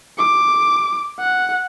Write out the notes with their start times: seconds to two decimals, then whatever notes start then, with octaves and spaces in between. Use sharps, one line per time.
0.18 D6
1.19 F#5